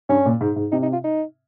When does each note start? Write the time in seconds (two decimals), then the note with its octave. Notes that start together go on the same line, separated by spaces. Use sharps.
0.09 G2 C#4
0.26 A#2
0.41 G#2
0.56 G#2
0.72 C3 D#4
0.83 D#4
0.93 F4
1.04 D#4